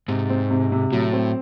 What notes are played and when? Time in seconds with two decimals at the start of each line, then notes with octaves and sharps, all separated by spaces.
0.08 G#2 C3
0.30 C4
0.50 C3
0.72 C3
0.92 A2 F#3
1.13 C4